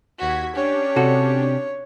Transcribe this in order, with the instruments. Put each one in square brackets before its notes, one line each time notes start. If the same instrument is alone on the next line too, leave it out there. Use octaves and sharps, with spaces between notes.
[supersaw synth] D#2 G#6 B6 [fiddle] F#4
[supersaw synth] C#4 D4 G4 [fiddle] C#5
[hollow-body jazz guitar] C3 F#4 A4